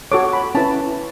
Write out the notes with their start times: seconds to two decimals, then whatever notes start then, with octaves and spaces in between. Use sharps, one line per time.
0.12 F#4 A4 C#5 D6
0.33 B5
0.55 C#4 E4 B4 A5